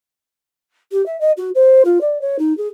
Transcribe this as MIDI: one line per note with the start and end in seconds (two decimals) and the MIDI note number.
0.91 1.04 67
1.06 1.19 76
1.20 1.31 75
1.37 1.50 66
1.55 1.82 72
1.85 2.01 65
2.01 2.21 74
2.21 2.36 73
2.39 2.55 63
2.57 2.68 68